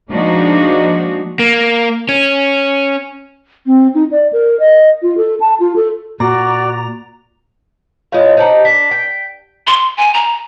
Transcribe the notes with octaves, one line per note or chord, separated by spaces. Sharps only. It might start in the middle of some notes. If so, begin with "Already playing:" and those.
F3 G#3 A#3 D4 D#4 F#4
A#3
C#4
C4
D#4
D5
A#4
D#5
F4
A4
A5
F4
A4
A#2 F#4 D5 A#5
A2 G#3 F4 C#5 F5
D#4 G4 C5 F#5 A5 A#5
D4 B6
G5
C6
G#5
A#5